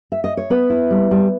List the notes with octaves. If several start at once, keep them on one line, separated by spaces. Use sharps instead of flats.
E5
D#5
C#5
B3 B4
E4
G3
G3